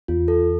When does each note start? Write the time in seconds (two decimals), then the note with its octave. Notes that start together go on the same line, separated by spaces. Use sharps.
0.08 E2 F4
0.28 A4